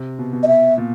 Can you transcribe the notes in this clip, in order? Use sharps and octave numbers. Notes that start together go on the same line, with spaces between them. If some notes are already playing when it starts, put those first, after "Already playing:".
Already playing: C3
B2
B2
D#5
E5
A#2